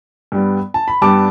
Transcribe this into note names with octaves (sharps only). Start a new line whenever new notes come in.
G2 G3 B3
A5
B5
G2 G3 B3 A5 D6